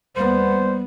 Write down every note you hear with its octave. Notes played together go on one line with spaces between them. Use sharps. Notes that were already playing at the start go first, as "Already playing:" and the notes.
D#2 G3 B3 C5